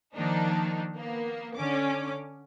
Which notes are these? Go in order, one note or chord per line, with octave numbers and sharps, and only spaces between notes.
D#3 F3 A#3 D4 D#4
A#3 B3
D3 C#4 D6